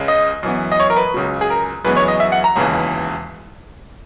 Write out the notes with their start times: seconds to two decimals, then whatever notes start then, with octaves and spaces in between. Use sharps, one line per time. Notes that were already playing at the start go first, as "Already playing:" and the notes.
Already playing: C#2 C#3 G#3
0.08 D#5
0.43 F#2 E3 B3
0.72 D#5
0.80 C#5
0.90 A#4
0.97 B4
1.14 C#2 C#3 F#3
1.41 G#4
1.50 A#4
1.85 F#2 E3 G#3 B3 B4
1.96 C#5
2.08 D#5
2.20 E5
2.32 F#5
2.44 A#5
2.56 E1 D#2 C#3 E3